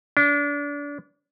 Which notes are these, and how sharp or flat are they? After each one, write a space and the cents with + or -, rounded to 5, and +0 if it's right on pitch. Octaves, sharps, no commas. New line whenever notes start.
D4 -30